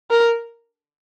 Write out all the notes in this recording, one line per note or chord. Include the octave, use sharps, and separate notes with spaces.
A#4